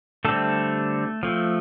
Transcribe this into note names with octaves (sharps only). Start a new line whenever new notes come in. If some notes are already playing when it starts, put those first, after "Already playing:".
D3 G3 A3 C4 A4
F3 A3 C4